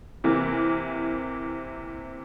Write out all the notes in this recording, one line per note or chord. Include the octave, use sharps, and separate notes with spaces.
C3 E3 A#3